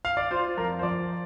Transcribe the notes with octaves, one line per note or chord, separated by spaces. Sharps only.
F5
D5
F4 C5
F2 A#4
C5
F3 D5